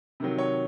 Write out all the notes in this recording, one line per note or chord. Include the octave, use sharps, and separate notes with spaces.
C3 D#3 F#3
C#5